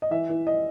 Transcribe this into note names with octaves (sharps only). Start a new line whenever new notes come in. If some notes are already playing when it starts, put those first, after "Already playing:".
D#5
E3 E5
E3
D#5